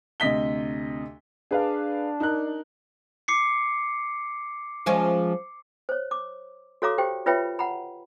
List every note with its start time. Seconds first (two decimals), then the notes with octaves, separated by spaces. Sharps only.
0.20 D2 C3 D#5 B6 G7
1.51 D4 G#4 B4 F5
2.20 D#4 A#4 F#6
3.28 D6 C7 C#7
4.86 F3 G#3 C#4
5.89 C5 C#5
6.11 D6
6.82 F#4 A4 C#5 F5 A#5 D6
6.98 G4 C5 G5
7.26 F4 B4 C#5 E5 G5 B5
7.59 F#5 A#5 B5